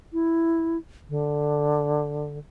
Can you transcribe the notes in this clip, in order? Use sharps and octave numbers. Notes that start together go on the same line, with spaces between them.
E4
D3